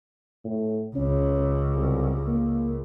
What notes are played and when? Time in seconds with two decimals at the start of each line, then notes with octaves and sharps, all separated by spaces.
0.45 A2
0.96 C#2 C#4
1.76 C2
2.27 A#3